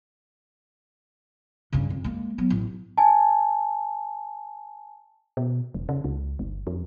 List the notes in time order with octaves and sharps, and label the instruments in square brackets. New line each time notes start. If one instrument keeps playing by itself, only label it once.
[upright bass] G2 C#3
F2
G#3 A#3
F#3 B3
A1
[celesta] G#5 A5
[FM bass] B2
F1
C#3
C#2
G1
F2